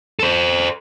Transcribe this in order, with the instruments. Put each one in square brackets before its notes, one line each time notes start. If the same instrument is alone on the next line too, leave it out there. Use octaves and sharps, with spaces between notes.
[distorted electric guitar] A4 C5